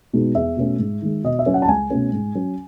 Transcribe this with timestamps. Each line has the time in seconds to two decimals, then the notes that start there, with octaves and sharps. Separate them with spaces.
0.13 B2 G#3 D#4
0.35 E2 E5
0.57 B2 A3 C#4
0.79 G#2
1.02 D#3 G#3
1.24 B2 D#5
1.39 E5
1.46 F#3 C#4
1.54 F#5
1.62 A5
1.68 C#2 G#5
1.90 B2 A3 C#4
2.13 G#2
2.35 F#3 C#4